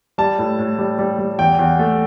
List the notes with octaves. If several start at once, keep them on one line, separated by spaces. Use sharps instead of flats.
G3 A5
A2
A2
G3
G3
G3
E2 G5
E2
A3